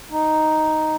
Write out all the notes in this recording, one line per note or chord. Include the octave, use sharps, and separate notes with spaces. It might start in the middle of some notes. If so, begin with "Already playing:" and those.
D#4